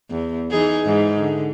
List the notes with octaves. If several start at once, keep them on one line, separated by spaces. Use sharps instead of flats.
E2
E3 D#4 G#4
G#2 E3
D3